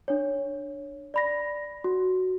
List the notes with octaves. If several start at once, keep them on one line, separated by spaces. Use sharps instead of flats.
D4 C#5
D5 B5 A#6
F#4